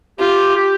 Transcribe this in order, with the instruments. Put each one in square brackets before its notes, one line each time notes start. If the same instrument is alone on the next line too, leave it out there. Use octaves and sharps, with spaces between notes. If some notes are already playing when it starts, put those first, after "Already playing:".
[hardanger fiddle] F4 [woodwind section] G4
[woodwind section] G4